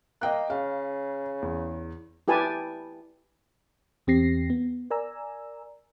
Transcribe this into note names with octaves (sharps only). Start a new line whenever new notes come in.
A#3 D#5 G5 F#6
C#3 F5
E2
E4 G4 B4 G#5 A5
E2 C4 G4 A#6 C7
B3
A#4 D5 G#5 A#5 E6